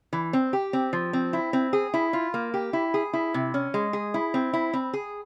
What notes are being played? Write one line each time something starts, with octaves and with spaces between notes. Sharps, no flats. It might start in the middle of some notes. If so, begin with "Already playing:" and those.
E3
C4
G4
C4
F3
C4
E4
C4
G#4
E4
F4
A#3
G4
E4
G#4
E4
C3
C#4
G#3
G#4
E4
C4
E4
C4
G#4